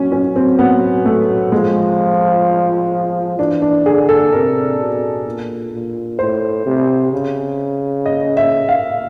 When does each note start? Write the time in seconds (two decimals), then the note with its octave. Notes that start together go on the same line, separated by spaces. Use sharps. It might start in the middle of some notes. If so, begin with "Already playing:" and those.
Already playing: F#3 C#4
0.12 C#4
0.36 C4
0.59 B3
1.05 A3
1.52 F3 G#3
3.38 E3 D4
3.62 D4
3.86 D3 G#4
4.09 A4
4.32 C3 A#4
4.79 B2
5.26 A#2
5.72 A#2
6.19 A2 C5
6.66 C3
7.12 C#3
8.06 D#5
8.37 E5
8.69 F5